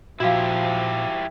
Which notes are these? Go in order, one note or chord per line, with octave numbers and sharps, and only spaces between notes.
A#2 F3 E4 F#4 G4 F5